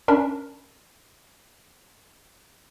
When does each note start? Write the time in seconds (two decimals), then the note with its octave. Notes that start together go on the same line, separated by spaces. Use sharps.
0.08 C#4 D4 A#4 B5